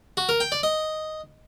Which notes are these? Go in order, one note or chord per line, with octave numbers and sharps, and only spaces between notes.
F#4
A#4
G5
D5
D#5